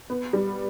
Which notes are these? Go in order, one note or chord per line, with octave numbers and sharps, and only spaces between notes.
B3
G3